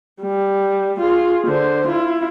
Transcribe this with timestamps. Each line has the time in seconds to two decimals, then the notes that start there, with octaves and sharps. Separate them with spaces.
0.22 G3
1.00 F4 G#4
1.47 D3 C5
1.88 E4 F4